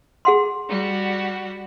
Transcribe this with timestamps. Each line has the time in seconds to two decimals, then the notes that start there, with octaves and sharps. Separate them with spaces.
0.25 G#4 F#5 C6
0.69 G3 F#4